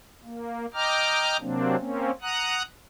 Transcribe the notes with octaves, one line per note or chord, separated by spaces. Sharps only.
A#3
D#5 G5 A#5 D6 F6
C3 F#3 A#3 C4 D4
A#3 C4 C#4
F#5 A#5 D#6 F#6